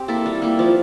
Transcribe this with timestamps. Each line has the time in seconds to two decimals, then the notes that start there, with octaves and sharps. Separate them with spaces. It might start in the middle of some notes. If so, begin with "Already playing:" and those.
Already playing: C4 G4
0.08 A#3 E4 A4
0.26 G3
0.42 A#3 E4
0.59 F3